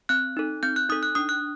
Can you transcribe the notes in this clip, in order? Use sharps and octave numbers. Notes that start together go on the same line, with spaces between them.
C4 F#6
D#4 A4
C4 G6
F#6
D#4 A4 D#6
F#6
D4 D#6
F#6